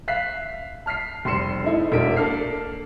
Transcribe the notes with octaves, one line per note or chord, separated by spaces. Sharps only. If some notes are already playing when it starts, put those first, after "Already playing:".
E5 F5 F#6 B6 C7
A5 F6 B6 C7
F1 G3 C6 C7 C#7 E7
A3 D#4 E4 E5
E1 E2 D4 A#4 B6 D7
A#3 D4 A4 F6 C7